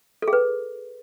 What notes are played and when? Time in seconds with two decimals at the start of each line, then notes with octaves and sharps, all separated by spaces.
0.22 A4
0.28 G#4
0.33 B4